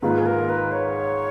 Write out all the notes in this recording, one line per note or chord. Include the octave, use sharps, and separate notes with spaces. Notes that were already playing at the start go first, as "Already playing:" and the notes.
G#2 D#3 A#3 F4 B4
G#4
A#4
B4
C#5